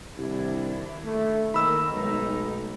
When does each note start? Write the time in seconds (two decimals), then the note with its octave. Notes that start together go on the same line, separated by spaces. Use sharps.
0.17 C2 D#3 D4 E4
1.04 A3
1.54 D#3 A#3 B5 E6
1.90 B1 G#3 A3 D#4